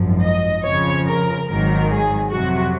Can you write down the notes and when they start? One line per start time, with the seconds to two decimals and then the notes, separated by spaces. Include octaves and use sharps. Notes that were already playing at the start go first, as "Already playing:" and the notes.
Already playing: G#1 F#2 F3
0.23 D#5
0.64 F2 C#3 F3 C#5
1.06 A#4
1.48 G#1 G#2 D#3 F#3 A#4
1.90 G#4
2.31 F2 C3 F#3 F#4